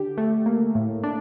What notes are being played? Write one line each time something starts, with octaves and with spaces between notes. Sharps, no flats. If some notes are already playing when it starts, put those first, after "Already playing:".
Already playing: D3 G4
A3
A#3
A2
D4